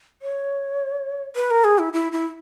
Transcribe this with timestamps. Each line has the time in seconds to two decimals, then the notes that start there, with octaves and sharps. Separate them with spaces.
0.22 C#5
1.35 B4
1.50 A#4
1.64 G#4
1.78 E4
1.93 E4
2.12 E4